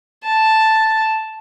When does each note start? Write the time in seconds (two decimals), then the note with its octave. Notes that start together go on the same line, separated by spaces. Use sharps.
0.24 A5